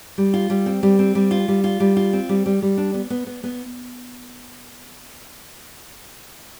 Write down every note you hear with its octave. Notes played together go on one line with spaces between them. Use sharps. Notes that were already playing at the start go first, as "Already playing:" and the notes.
G3
F4
G3
C4
G3
C4
G3
F4
G3
F4
G3
F4
C4
G3
G3
G3
D4
B3
B3
B3
B3